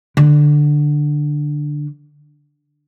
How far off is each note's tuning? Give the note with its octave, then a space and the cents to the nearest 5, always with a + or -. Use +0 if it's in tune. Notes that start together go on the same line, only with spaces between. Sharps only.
D3 +10